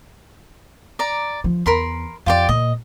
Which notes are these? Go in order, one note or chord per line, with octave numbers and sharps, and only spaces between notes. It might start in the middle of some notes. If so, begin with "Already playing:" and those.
D5 A#5
F3
E2 A#4 B5 C6
F2 F4 G4 D5
A#2 D#5